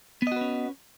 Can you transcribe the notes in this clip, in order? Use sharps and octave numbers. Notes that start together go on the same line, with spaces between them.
B3 C#4 F#4 B4 D#5